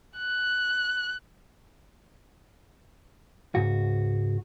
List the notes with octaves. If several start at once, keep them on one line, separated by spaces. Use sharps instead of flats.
F#6
C#2 G#2 F#4